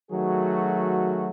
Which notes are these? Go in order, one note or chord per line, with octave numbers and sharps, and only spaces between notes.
D#3 F#3 A3 F#4 G#4